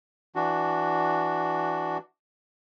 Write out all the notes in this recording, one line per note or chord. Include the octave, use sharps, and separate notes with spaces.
E3 D4 F#4